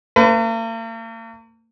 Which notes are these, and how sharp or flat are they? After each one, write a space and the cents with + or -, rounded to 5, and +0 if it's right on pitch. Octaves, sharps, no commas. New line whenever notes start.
A#3 -45 B4 +35